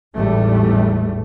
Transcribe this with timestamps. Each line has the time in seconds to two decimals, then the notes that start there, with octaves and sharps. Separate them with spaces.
0.15 G#1 E2 A2 G3 A3